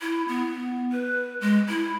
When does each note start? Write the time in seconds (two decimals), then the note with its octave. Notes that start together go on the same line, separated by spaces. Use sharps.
0.01 E4
0.28 B3
0.92 B4
1.41 G#3
1.69 E4